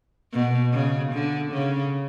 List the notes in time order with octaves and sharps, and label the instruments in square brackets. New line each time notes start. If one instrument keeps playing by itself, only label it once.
[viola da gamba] B2
C#3
D3
C#3